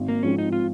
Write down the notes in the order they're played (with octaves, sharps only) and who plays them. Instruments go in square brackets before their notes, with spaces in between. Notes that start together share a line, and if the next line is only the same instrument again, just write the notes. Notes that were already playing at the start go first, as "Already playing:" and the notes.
Already playing: [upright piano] G#1
[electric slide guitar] A#3
[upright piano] G#2 F3 C4 [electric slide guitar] C#4
[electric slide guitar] D#4
F4